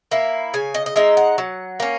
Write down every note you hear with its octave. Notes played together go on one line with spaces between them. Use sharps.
A#3 E4
C#3 G#5
D#5
D#5
G#3 D#4 E5
F#5
F#3
A#3 C#4